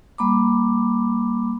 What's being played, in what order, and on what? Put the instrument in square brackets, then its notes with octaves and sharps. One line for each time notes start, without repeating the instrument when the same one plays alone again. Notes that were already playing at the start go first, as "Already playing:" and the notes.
[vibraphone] G3 A#3 B5 D6